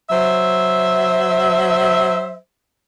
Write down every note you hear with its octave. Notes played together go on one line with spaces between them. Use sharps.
F#3 C5 E5